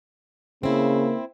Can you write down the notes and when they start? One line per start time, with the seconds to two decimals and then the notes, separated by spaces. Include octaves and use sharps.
0.63 C#3 A#3 C4 E4